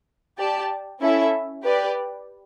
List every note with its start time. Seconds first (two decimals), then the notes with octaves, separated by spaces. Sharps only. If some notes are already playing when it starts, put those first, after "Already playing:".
0.38 G4 D5 A5
1.01 C#4 E4 A4 E5
1.64 G4 B4 D5